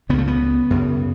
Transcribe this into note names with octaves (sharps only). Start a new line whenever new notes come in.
C#2 C#3 B3
A3
B3
F#2 C#3